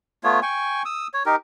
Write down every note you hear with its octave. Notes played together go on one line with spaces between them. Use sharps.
A3 B3 F4 C#5
G5 G#5 C#6
D#6 E6
C#5
D#4 G4 A#4